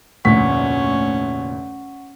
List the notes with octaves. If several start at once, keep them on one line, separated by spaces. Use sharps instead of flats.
F1 D2 A#2 C#4 F#5 C#6 B6